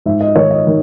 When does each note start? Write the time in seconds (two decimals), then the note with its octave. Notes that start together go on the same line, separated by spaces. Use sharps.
0.06 G#2 E5
0.21 D#5
0.36 D#3 C#5
0.51 D#5
0.67 D#3